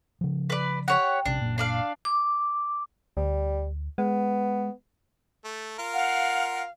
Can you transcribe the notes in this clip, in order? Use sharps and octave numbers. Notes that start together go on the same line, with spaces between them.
C#3 F3
B4 D5
G4 C#5 F#5
A#1 C3 C#4 D4
F#1 A#2
D4 D5 F5
D6
D2 G3
G#3 B3
A3
F4 A#4
F5 F#5